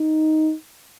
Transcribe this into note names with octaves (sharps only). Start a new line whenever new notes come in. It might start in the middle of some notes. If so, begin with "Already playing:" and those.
Already playing: D#4